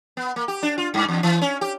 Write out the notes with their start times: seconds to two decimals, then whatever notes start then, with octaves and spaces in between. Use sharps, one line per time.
0.17 B3
0.36 A#3
0.48 G4
0.63 D4
0.78 F4
0.94 G2
1.08 E2
1.23 E3
1.42 C#4
1.61 G4